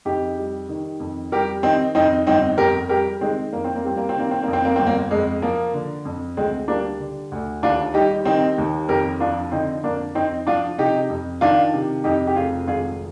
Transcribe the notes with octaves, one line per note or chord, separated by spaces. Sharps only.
F2 D#4 G4
G3
D#3
F2
G3 G4 A#4
D#3 C4 D#4
F2 C4 D#4
G1 C4 D#4
F2 G4 A#4
G3 G4 A#4
D#3 G#3 C4
F2 A#3
C4
A#3
G3 C4
A#3
C4
D#3 A#3
C4
A#3
F2
C4
A#3
G1 C4
A#3
F2 G#3
F3 A#3
D3
F2
D2 G#3 C4
G3 A#3 D4
D3
D2
D#2 D4 F4
G3 D#4 G4
D#3 C4 D#4
D#2
F2 G4 A#4
F3 D4 F4
D3 C4 D#4
F2 A#3 D4
F2 C4 D#4
F3 D4 F4
C3 D#4 G4
F2
D#3 D4 F4
C3
F2 D#4 G4
G4
F1 F4 G#4
G#1 F4 G#4